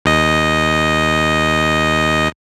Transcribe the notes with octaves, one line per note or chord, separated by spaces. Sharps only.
D#2 D#5